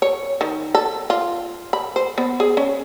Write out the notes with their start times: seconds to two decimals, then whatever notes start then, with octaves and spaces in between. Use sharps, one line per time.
0.02 C#5
0.41 D#3
0.75 A4
1.10 F4
1.73 B5
1.96 C5
2.18 B3
2.40 G#4
2.57 C#4